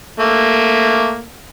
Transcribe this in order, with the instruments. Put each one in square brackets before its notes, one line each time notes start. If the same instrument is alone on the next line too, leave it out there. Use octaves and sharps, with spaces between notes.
[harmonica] A3 A#3